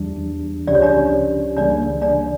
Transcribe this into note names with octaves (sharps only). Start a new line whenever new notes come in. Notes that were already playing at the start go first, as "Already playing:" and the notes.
Already playing: E2 E3 G3 D4
C#2 C#3 F3 C#4 G4 D5
C#5
D4 D5
C#2 C#3 E3 G3 A#3 D4 D5
D4 D5